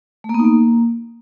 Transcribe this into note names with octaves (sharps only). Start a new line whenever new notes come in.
A3
A#3
B3
D#4
A#3